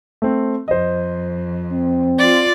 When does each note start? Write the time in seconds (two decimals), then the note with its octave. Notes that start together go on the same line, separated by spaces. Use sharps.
0.22 A3 C4
0.68 F2 C5 D#5
1.73 C4
2.18 F4 D5